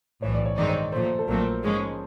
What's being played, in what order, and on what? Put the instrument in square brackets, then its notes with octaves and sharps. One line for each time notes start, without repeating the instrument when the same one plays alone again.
[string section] B1 A2 E3 [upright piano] C#5
[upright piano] D5
C#5
[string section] G2 D#3 G#3 C4 D#4 [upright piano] D5
[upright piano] C#5
[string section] A#2 F3 A3 [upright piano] C5
[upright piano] A4
[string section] A#1 A#2 F#3 A3 C4 [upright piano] A#4
[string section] G#2 F3 G#3 C#4